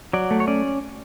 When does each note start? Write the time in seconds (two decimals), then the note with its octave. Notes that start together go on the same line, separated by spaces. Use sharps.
0.13 F#3 D5
0.31 A3
0.40 C#5
0.47 C#4 D5